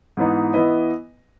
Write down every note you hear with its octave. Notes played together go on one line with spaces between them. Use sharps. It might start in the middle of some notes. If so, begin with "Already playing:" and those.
G#2 E3 B3 D#4
E3 B3 E4 B4 D#5